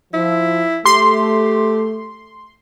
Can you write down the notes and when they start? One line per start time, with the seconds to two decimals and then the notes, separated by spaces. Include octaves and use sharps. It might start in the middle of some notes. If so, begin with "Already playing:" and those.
0.14 F3 E4
0.86 A3 G4 C6